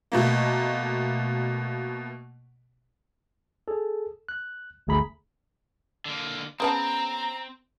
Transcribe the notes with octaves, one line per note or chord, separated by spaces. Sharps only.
B2 A3 A#3
G#4 A4
F#6
G1 D2 A3 G#4 A#5 B5
D3 A#3
C#3 B3 C4 A5 A#5